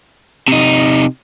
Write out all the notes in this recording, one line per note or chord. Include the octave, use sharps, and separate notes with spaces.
C3 D#4